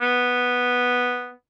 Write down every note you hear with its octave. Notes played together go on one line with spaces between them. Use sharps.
B3